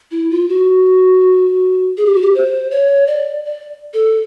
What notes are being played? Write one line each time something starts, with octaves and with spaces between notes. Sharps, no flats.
E4
F4
F#4
G#4
G4
F#4
G4
C5
C#5
D5
D5
A4